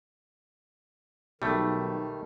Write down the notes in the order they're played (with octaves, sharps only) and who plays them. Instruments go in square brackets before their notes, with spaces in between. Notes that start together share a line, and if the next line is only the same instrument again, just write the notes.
[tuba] B1 [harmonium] D#3 [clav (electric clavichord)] G3 A3